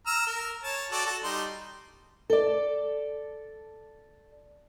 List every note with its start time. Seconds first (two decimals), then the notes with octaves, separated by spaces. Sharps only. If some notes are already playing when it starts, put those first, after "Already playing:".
0.07 A#5 E6 F6
0.27 A#4
0.63 C#5 A5
0.92 F#4 A4 D5
1.06 F#4 A4
1.24 G3 D#4 C6
2.30 A4 D5